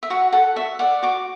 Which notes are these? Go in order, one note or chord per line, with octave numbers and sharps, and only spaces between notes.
E5
F#4 F#5
A4 F#5
F#4 E5
D5 F#5
F#4 D6